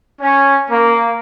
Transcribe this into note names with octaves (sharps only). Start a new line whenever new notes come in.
C#4
A#3